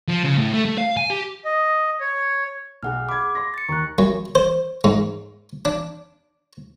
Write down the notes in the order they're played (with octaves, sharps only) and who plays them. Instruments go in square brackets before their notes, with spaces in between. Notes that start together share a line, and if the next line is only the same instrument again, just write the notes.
[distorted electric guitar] F3
C#3
A2
A3
A3
F5
G#5
G4
[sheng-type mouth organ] D#5
C#5
[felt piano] B1 [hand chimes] G#4 F#5 F6
[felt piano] B5 G#6 [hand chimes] D6
[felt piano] C6 A#6
[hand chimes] A6 C#7
[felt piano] D#2 A#5 [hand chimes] C#6 F#6
[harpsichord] F#2
C5
G#2
D4